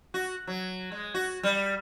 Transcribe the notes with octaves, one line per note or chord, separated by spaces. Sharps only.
F#4
F#3
G#3
F#4
G3